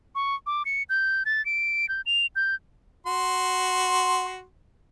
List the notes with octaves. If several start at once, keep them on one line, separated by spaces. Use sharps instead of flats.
C#6
D6
C#7
G6
A6
D7
G6
F7
G6
F#4 C6